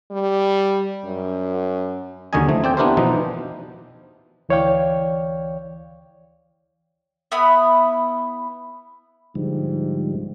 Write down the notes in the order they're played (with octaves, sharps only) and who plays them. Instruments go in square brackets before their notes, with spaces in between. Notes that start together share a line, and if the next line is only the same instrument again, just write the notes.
[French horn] G3
F#2
[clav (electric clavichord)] D#2 D3 F#3 C#4 D#5 G#5
F3 A3
C4 D5 G5
B3 D4 E4 G4 A#4 C5
B2 E3 F3 D#4
[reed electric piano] D2 E3 C#5 D5 F5 G5
[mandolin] B3 E4 B5 D#6
[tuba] G#2 [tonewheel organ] D3 F3 G3